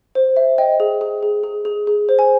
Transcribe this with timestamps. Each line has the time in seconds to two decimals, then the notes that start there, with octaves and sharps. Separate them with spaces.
0.15 C5
0.36 E5
0.58 D#5 G5
0.80 G#4
1.01 G#4
1.23 G#4
1.44 G#4
1.65 G#4
1.87 G#4
2.09 C5
2.19 G#5